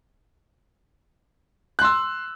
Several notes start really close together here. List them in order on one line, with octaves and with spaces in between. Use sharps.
F#6 C6 E6